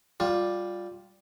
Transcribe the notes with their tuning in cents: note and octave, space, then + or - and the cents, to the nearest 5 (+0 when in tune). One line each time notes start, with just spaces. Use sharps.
G3 +0 F4 +15